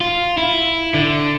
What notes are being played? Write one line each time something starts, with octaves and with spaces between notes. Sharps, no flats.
F4
E4
D3